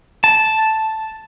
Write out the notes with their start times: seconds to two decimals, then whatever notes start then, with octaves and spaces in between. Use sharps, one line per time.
0.24 A5